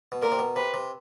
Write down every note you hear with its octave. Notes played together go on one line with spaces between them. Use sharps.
B2
A#2 A#4
C3
B2
C3 B4
C3